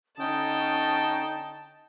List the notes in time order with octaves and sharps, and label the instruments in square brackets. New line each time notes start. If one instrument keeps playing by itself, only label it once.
[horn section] D3 D#4 G5 [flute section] C#4 D#6 [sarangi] A5